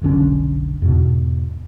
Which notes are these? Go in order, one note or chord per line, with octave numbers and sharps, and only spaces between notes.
F1 B1 D3 C#4
E2 G#2 B2